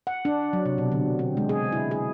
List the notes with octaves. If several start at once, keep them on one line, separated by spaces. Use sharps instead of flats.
F#5
D4
F#3
C3
B2
D3
C4
G#3
G#4
E4
G#4